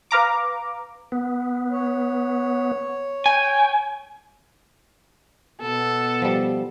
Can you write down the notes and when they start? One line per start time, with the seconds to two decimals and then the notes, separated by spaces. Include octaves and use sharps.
0.11 B4 F5 A#5 D6
1.12 B3
1.71 C#5
3.26 G5 G#5
5.61 B2 B3 A4
6.22 F3 G3